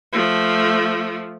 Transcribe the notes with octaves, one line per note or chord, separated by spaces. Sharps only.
F3 A3